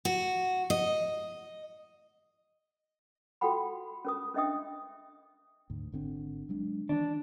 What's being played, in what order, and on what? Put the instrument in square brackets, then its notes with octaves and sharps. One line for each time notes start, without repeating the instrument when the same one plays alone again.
[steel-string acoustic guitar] F#4
D#5
[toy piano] F4 F#4 A4 F#5 G5 B5
C#4 A#4 D#6
C#4 D4 D#5 E5 G5 D#6
[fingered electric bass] D2 G#2
G#1 D3 C4
F#3 G#3 D4
[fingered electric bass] D#3 E3 [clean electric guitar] D4